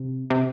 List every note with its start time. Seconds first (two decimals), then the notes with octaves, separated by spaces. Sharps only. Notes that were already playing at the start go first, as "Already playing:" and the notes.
Already playing: C3
0.30 C3